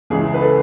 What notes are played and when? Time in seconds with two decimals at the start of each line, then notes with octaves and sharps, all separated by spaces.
0.10 C#2 C#3 E3 G#4
0.34 B4
0.42 A4